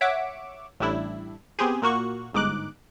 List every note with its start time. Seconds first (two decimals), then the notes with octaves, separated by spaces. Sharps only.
0.01 C#5 E5 F#5 D6
0.80 A1 A2 G3 D4 E4
1.59 B3 C4 G4 G#4
1.82 A#2 A#3 F#4 C#6
2.33 G1 G#2 D#4 D6 F#6